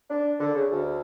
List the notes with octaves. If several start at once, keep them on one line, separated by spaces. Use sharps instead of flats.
D4
D3
C#3
D2